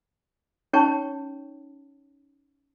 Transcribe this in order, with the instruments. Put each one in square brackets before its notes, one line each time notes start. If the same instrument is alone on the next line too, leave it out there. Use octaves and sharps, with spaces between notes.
[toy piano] C#4 D#4 C#5 G5 A5 C#6